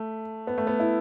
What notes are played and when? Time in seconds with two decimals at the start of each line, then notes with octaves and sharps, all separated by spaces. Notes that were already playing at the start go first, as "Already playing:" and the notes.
Already playing: A3
0.47 B3
0.58 A3
0.67 B3
0.80 E4